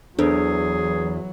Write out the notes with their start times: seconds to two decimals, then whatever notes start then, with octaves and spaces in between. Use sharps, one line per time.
0.19 E2 E3 F#3 D4 G#4 A4 C5